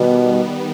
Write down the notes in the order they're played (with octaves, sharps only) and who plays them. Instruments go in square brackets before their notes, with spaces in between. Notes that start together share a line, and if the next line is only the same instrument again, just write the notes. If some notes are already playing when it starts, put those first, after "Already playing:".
Already playing: [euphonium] B2 [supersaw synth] D#3 G3 B3